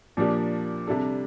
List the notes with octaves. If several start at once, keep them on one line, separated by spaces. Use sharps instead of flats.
A#2 F3 A#3 D4 G4
C3 G3 D4 A4